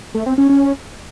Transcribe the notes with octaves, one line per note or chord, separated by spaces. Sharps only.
A3
C4
C#4
C#4